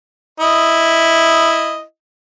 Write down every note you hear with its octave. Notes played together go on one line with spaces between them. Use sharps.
E4 D#5